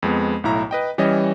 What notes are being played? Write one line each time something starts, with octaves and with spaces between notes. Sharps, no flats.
F2 G#3 B3
B1 A2 E4 A#5
B4 D#5 G5
E3 G3 C#4 C#5 D#5